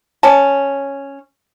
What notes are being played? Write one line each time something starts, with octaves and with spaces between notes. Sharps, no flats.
C#4 A5